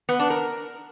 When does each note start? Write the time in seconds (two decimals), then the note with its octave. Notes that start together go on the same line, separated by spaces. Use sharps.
0.09 B3
0.19 D4
0.30 A#4